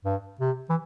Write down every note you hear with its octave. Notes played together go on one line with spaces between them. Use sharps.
G2
C3
E3